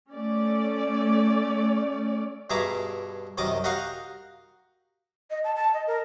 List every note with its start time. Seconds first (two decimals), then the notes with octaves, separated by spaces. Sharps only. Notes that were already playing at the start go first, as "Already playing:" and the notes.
0.13 A3 C#4 D5
2.50 G2 B2 G#4 E5 A#5 D6
3.38 C2 F#2 D#3 D#5 D6
3.64 F#4 G4 A#4 D#5 F5 F#5
5.30 D#5
5.44 A5
5.56 A5
5.74 D#5
5.87 A#4